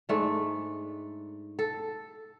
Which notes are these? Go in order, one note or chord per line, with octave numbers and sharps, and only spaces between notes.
G#2 A3 D4
A4